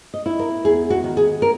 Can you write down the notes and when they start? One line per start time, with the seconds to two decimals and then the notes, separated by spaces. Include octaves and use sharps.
0.14 D#5
0.26 E4
0.39 A#4
0.65 E2 G#4
0.90 F#4
1.04 D#3
1.17 G#4
1.42 A#4